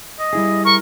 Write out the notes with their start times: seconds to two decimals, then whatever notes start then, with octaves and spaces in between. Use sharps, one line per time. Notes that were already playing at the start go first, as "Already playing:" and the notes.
0.20 D#5
0.33 G3 E4 G#4
0.65 A#4 C#6